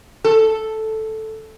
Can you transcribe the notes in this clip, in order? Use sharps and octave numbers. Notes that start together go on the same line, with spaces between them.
A4